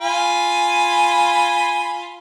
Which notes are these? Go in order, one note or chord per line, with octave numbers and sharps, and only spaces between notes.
F4 G#5 B5